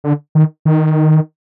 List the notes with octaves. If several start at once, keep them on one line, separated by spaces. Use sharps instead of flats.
D3
D#3
D#3